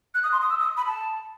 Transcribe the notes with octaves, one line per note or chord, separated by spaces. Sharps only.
F#6
D#6
C6
D#6
E6
D#6
B5
A5